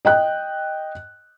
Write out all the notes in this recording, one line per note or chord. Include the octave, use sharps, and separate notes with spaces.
D#5 G5 F#6